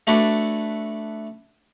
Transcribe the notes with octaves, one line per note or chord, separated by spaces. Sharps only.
A3 D4 F#4 B4 C#5 D5